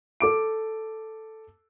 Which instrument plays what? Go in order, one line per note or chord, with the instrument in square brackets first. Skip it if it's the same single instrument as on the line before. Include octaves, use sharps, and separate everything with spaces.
[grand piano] A4 D6 D7